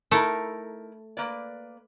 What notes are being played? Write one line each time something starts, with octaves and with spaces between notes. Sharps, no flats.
A3 D#4 E4 A4 A#4
A#3 B4 D5